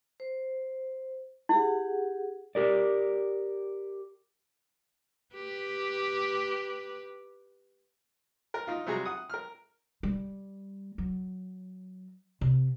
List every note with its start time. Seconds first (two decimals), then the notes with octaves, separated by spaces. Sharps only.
0.20 C5
1.49 E4 G4 G#4 F#5
2.55 G4 A#4 D5
5.34 G4 B4
8.54 A#4
8.67 D#4 F4
8.87 C3 G3 F#4 G#4 A#5
9.05 F#5 D#6
9.30 A#4 F6
10.03 G3
10.98 F#3
12.41 C3